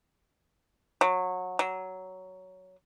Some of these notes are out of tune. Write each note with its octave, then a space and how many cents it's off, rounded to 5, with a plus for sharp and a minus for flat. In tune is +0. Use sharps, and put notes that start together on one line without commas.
F#3 -20
F#3 +10